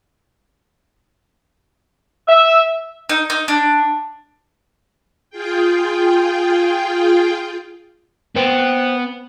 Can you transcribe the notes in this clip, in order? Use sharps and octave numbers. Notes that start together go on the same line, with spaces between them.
E5
D#4
D#4
D4
F4 G#4 G5
B3 B4 C5 G5